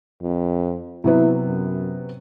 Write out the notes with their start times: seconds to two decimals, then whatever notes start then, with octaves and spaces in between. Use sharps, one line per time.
0.22 F2
1.04 C3 F#3 B3 E4
1.46 F#2